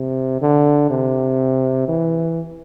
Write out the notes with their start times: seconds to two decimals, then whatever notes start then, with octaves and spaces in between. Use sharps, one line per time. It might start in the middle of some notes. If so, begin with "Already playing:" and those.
Already playing: C3
0.41 D3
0.90 C3
1.88 E3